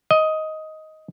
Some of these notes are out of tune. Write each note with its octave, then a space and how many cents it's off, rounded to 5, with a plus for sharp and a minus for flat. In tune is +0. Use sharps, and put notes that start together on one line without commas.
D#5 +10